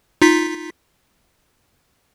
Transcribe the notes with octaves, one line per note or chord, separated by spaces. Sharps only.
D#4 F4 B6